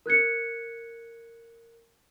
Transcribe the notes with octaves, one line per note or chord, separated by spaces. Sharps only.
A#4 F#6 G#6 C#7